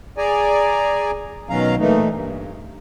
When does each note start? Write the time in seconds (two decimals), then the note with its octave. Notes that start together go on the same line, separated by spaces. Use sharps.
0.18 G#4 D5 G#5 A#5
1.50 B2 D#3 F#3 C#4 F5 A#5
1.79 A#2 E3 A3 D#4
2.10 G2